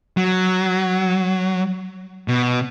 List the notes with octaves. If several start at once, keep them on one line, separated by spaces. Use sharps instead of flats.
F#3
B2